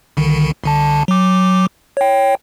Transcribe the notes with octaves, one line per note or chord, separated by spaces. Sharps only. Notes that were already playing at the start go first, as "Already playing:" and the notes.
C2 D3 D#3
C2 D3 A5
F#3 D6
C#5 G5